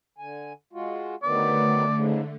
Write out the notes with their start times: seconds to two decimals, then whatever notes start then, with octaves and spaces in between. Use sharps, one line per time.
0.18 D3 G#5
0.73 G#3 F4 F#4
1.23 D3 D#3 F#3 A3 B3 D5
1.94 G#2 C#3